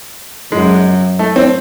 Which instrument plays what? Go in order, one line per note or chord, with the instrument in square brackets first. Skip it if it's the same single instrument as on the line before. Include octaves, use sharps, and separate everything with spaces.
[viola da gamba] F#2 [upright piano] G#3
[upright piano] A3
C4